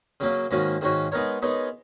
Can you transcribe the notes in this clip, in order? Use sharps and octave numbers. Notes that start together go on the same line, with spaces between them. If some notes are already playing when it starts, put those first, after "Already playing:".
C#3 F#3 A#3 C#4
G#2 D#3 A#3 C#4 F#4
G#2 D#3 A#3 C#4 F#4
G#3 B3 D#4 A#4 C#5
G#3 B3 D#4 A#4 C#5